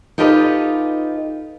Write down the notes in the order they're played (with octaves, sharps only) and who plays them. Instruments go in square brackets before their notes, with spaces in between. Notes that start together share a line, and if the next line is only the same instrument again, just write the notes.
[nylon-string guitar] D#4 F4 G4 A4 B4 D#5